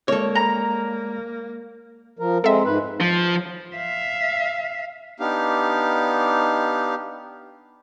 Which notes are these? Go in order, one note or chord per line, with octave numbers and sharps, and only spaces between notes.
G#3 A#3 A4 C#5 D5 G#6
A#5
F3 A#4
G#3 C4 A4 E5
G#2 B4
F3
E5 F5
B3 D4 D#4 G4 F5